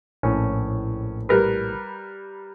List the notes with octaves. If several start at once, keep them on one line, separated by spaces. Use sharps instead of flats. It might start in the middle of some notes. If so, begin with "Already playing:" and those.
A#1 A2 C#4
G3 A#4 B4